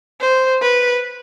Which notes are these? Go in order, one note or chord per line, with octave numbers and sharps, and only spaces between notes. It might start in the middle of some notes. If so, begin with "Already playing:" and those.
C5
B4